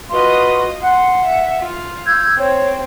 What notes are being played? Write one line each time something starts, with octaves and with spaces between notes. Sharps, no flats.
F4 F#4 B4 D#5 C6
F#5 C6
E5
F4
E6 G6 G#6
C4 C#5